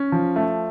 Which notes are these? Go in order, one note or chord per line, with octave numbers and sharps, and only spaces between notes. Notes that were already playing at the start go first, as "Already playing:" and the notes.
Already playing: C#4
F3
A3